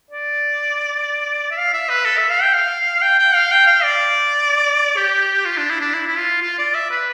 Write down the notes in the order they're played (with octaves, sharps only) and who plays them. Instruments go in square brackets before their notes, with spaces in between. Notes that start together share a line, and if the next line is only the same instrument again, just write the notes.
[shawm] D5
E5
F5
E5
B4
A4
E5
F5
G5
F5
G5
G5
F5
G5
F5
D5
G4
F4
D4
E4
D4
E4
E4
F4
F4
D5
E5
B4